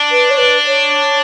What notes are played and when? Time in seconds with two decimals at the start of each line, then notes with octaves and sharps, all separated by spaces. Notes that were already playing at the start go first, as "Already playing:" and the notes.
Already playing: D4
0.11 B4
0.30 C#5
0.38 B4
0.66 C#5